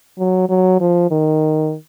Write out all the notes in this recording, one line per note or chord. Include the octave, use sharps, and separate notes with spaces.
F#3
F#3
F3
D#3